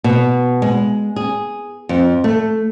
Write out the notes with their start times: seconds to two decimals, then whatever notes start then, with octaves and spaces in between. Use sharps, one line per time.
0.04 B2
0.62 G#3
1.16 G#4
1.89 F2
2.24 A3